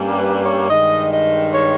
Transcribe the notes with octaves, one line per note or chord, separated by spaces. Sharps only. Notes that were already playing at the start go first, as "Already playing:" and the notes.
Already playing: G2 G3 A#3 C#4
B4
C#5
G2 D#3 G#3 D#5
D#5
C#5